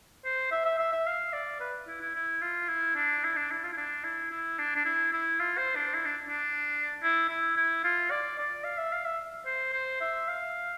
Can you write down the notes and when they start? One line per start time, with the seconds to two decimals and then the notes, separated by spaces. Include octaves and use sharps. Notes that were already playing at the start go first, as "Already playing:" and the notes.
0.25 C5
0.52 E5
0.65 E5
0.79 E5
0.93 E5
1.07 F5
1.33 D5
1.60 B4
1.88 E4
2.01 E4
2.15 E4
2.42 F4
2.68 E4
2.96 D4
3.24 E4
3.37 D4
3.51 E4
3.64 F4
3.72 E4
3.77 D4
4.04 E4
4.31 E4
4.59 D4
4.76 D4
4.85 E4
5.13 E4
5.40 F4
5.58 C5
5.76 D4
5.94 E4
6.06 D4
6.28 D4
7.03 E4
7.29 E4
7.57 E4
7.84 F4
8.11 D5
8.39 D5
8.64 F5
8.78 E5
8.93 F5
9.05 E5
9.46 C5
9.73 C5
10.01 E5
10.28 F5